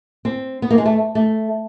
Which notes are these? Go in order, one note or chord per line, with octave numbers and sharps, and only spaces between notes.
C4
B3
A#3
G#3
A3
A3